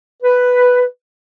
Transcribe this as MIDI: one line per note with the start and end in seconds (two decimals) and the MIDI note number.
0.23 0.85 71